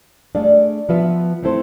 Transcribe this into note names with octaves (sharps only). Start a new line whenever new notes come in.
A3 D4 G#4 D5 F5
F3 B3 F4 B4 E5
A3 C4 E4 A4 C5